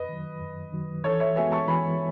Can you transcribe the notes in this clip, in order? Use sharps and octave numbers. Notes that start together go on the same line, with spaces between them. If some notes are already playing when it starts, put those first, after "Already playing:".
Already playing: F#2 B4 D#5
D#3 F#3
F#2
D#3 F#3
E3 A4 C#5
C#5 E5
G#3 B3 F#4 B4 E5 G#5
A5 C#6
E3 G#5 B5